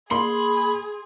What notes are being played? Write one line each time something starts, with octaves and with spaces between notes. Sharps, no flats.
A#3 G#4 B5 C6